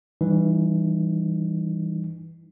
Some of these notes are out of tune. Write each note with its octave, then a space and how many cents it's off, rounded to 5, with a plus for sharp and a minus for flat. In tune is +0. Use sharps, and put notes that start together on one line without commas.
E3 +0 G3 +0 D#4 -35